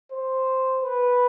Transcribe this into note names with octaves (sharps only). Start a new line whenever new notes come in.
C5
B4